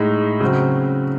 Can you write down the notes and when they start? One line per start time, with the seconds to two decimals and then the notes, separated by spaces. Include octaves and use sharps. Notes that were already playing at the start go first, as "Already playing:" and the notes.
Already playing: A2 G#3 D#4
0.41 C#3 F#3 C4